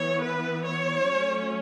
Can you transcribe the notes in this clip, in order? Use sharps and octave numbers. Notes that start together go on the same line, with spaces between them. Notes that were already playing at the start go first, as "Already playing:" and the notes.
Already playing: E3 B3 C#5
B4
C#5
F#3 A3 C#4